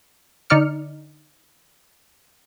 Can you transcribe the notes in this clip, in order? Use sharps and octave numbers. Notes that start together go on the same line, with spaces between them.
D3 D#4 D5 F6 C#7